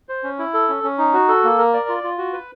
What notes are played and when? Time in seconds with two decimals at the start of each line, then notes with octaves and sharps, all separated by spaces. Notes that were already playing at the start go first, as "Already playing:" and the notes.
0.09 C5
0.24 C#4
0.39 E4
0.54 A4
0.69 C#4
0.83 C#4
0.98 D#4
1.13 F#4
1.28 A4
1.44 A#3
1.58 A#4
1.74 D5
1.89 F4
2.03 F4
2.18 F#4
2.33 B4